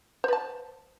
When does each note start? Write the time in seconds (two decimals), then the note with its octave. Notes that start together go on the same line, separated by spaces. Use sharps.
0.24 C5
0.28 B4
0.33 A5